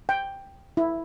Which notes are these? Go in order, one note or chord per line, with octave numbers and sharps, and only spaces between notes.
G5
E4